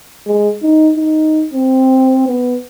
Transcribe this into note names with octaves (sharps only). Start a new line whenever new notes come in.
G#3
D#4
D#4
C4
B3